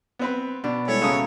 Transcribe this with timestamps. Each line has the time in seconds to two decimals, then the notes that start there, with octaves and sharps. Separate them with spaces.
0.19 B3 C4 B4
0.64 B2 D4
0.88 G3 G#3 E4 A4 C#5
1.02 D#2 C#3 F#4 F5 A5 A#5 D#6